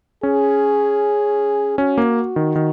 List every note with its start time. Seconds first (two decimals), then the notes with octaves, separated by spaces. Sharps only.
0.23 C#4 G#4
1.78 C#4 F#4
1.98 A#3
2.36 D#3
2.56 D#3